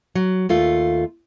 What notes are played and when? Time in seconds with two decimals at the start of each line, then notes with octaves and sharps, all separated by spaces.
0.15 F#3
0.49 D#2 A3 F4